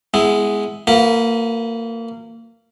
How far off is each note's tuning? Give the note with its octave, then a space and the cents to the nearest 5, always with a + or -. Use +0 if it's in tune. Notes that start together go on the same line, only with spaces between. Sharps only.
G#3 +0 B3 +15 E4 -5
A#3 -25 F4 +45 B4 -15